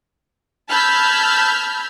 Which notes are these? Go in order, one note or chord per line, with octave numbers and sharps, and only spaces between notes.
A5 B5 E6 F6 G6 G#6